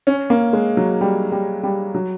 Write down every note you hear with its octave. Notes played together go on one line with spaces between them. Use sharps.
C#4
A#3
G#3
F#3
G3
G3
G3
F#3